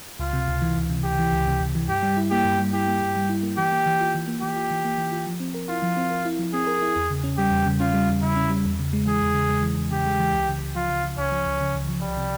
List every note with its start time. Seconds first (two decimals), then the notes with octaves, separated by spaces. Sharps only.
0.19 C#2 F4
0.33 C3
0.48 C#2
0.62 E3
0.76 C#2
0.90 C3
1.04 C#2 G4
1.19 E3
1.33 C#2
1.47 C3
1.61 C#2
1.75 E3
1.88 G2 G4
2.03 G3
2.17 E4
2.30 A#3 G4
2.44 G2
2.59 G3
2.73 E4 G4
2.87 A#3
3.02 G2
3.16 G3
3.29 E4
3.43 A#3
3.57 E3 G4
3.72 A#3
3.86 E3
4.00 F4
4.15 E3
4.28 A#3
4.42 E3 G4
4.56 F4
4.71 E3
4.84 A#3
4.98 E3
5.12 F4
5.26 F3
5.40 C4
5.54 A#4
5.69 E4 F4
5.82 F3
5.96 C4
6.11 A#4
6.25 E4
6.39 F3
6.54 C4 G#4
6.67 A#4
6.82 E4
6.96 E2
7.10 C#3
7.24 C#4
7.37 G3 G4
7.52 E2
7.66 C#3
7.80 C#4 F4
7.94 G3
8.09 E2
8.22 C#3 E4
8.36 C#4
8.50 G3
8.65 E2
8.79 C#3
8.93 G#3
9.07 E3 G#4
9.21 E2
9.34 C#3
9.49 G#3
9.63 E3
9.78 E2
9.91 C#3 G4
10.06 G#3
10.19 E3
10.33 C#2
10.48 C#3
10.61 C#2
10.75 F3 F4
10.90 C#2
11.03 C#3
11.17 C#2 C#4
11.32 F3
11.46 C#2
11.61 C#3
11.74 C#2
11.89 F3
12.02 C2 G3
12.17 C3